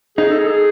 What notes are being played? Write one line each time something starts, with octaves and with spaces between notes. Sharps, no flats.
D#4 G#4
A4
G#4
A4
G#4